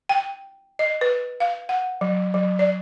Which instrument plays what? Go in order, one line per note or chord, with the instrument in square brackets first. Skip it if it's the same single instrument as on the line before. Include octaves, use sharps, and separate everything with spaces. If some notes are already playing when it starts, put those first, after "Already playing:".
[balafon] G5
D#5
B4
F5
F#5
F#3
F#3
D5